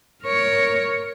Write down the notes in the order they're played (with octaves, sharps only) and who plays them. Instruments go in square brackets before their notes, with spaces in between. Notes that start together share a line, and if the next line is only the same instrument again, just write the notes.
[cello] A#4 C#5